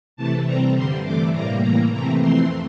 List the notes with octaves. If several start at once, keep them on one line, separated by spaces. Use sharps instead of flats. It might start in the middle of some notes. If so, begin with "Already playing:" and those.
C3 E3 A3 A5
C3 G3 C4 A#5
G2 D3 G3 C6
C3 E3 A3 D6
A2 G3 A#3 A#5
A2 E3 A#3 A#5
C3 E3 A3 C4 A#5
F2 E3 A3 C4 C6